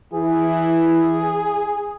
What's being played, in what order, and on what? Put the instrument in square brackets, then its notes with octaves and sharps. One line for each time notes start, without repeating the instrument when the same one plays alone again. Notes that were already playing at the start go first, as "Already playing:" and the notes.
[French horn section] E3 E4 [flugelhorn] G#4